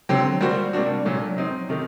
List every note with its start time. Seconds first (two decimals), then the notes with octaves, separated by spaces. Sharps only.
0.09 D3 F#3 C4 G4
0.41 G3 A#3 F#4 C5
0.73 C3 G3 A#3 D4 F#4
1.05 A#2 F#3 A3 D4
1.36 F#3 C4 D#4
1.69 C3 D#3 A3 D#4